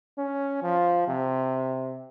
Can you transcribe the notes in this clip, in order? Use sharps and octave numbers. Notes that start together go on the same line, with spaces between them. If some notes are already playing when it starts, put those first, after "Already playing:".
C#4
F3
C3